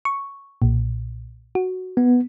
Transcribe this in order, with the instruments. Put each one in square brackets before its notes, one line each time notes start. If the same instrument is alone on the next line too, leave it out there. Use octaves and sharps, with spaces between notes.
[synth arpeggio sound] C#6
B1 A#2
F#4
[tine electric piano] B3